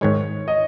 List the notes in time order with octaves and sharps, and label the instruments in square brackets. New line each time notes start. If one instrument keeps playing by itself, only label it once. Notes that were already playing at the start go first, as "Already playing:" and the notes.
[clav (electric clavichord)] G#2 D#3 G#3 [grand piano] C#5
[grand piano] D#5